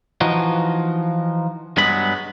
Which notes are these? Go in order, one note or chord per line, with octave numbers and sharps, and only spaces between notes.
E3 F3 D#4 F#4
G2 F#3 G#3 B3 B5